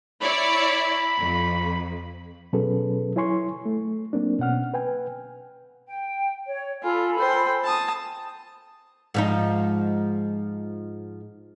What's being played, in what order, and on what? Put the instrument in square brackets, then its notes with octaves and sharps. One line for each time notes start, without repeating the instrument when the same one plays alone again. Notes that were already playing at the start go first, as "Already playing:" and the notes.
[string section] E4 C#5 D5 [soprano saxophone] B5
[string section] F2
[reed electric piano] B2 F#3 C#4 G#4 A4 B4
F#3 E4 C#5 G#5 C6 C#6
A3
F#3 A#3 C4 D4
B2 C#4 F#5 F6
B4 G5 G#5
[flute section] G5
C#5
[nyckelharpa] F4 [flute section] A4 G#5 B5
[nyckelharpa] C5 G5
A5 D#6
[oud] G#2 F3 D#4